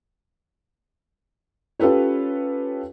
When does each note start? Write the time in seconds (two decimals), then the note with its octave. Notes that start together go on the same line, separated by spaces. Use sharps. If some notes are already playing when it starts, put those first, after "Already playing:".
1.80 C#4 F4 G4 A4 B4 C#5